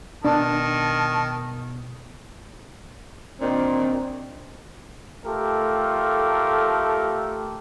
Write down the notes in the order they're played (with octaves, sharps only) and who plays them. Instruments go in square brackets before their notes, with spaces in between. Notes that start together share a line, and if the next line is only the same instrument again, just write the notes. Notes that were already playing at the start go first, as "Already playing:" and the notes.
[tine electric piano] B2 B3 [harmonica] D#3 [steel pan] D4 [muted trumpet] A5
[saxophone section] A#2 D#3 D4 [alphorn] C4
[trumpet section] A3 F4 G4 A4 A#4